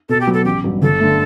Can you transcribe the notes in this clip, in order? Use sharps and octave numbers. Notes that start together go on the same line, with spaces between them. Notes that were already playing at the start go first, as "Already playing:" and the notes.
B2 A4
G4
F#3 B3
A4
A1 G4
G2 F#3
G1 A4
D3 A3